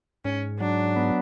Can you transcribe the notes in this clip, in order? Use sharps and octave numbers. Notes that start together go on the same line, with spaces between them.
G#2 C#4
F#3 D4
B3